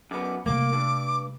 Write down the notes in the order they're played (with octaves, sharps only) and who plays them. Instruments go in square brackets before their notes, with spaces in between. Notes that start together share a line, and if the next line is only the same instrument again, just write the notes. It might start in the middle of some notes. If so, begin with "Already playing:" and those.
[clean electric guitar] F#2 B3 [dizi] D6
[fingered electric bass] C3 G3 A3 [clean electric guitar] A#3 [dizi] D6
[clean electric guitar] G2